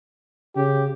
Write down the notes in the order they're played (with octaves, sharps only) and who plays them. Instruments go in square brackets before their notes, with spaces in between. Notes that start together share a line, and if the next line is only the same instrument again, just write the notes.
[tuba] C#3 [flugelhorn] G4